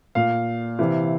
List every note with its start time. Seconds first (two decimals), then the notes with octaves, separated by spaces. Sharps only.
0.15 A#2 F5
0.79 C3 E3